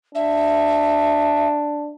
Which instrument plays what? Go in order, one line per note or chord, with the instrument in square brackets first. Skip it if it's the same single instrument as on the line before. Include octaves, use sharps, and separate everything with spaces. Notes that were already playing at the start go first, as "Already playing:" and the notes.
[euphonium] D4 [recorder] E5